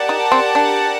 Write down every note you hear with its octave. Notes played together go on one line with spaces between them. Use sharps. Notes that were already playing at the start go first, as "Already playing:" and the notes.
Already playing: G4 A#4 D5 F#5 A5
D#4
C4
D4